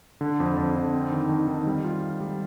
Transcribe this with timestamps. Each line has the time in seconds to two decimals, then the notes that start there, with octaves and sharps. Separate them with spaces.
0.21 D3
0.40 F2
0.57 F2
0.76 D3
0.94 C4
1.12 D#3
1.29 D#3
1.48 D#3
1.67 G3
1.84 F4
2.02 F4
2.20 G3